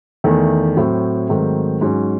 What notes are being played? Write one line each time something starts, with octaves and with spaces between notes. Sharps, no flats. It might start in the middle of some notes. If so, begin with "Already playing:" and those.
E2 D#3 A3
A2 F#3 C4
G#2 D#3 F#3 A3 C4
G#2 F#3 C#4